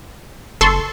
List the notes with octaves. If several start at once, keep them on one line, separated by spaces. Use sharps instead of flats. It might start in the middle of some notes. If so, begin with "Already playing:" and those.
F#1 A4 C6 C#6